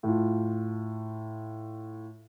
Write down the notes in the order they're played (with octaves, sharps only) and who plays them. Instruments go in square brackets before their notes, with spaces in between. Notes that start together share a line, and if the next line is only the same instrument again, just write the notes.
[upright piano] A2 F4